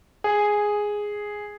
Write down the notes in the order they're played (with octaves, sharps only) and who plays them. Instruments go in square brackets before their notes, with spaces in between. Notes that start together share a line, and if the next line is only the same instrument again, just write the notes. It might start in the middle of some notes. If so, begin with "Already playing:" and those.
[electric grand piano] G#4